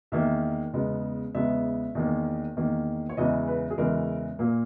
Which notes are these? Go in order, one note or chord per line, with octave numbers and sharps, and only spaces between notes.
E2 D#3 A#3 E5
E2 C#3 G#3 B3
E2 C#3 G#3 B3 E5
E2 D#3 A#3
E2 D#3 A#3
C#5
E2 C#3 E3 G#3 D#5
B4
G#4
E2 C#3 E3 G#3 A#4
A#2 A#3